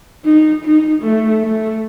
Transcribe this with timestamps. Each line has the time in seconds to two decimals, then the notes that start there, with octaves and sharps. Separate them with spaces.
0.25 D#4
0.64 D#4
1.03 A3
1.43 A3